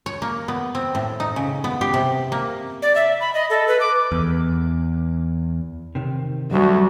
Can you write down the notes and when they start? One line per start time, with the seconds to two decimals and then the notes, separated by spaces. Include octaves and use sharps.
0.06 C#5
0.22 A#3
0.48 B3
0.75 C4
0.95 A2
1.20 D#4
1.36 C#3
1.64 B3
1.81 G4
1.94 C3
2.32 A#3
2.82 D5
2.96 E5
3.20 B5
3.34 D#5
3.50 A4
3.68 B4
3.80 D6
4.12 E2
5.95 C3 D#3
6.51 D2 F#3 G3 D4 F#4